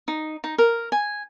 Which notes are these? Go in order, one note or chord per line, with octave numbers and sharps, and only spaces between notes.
D#4
D#4
A#4
G#5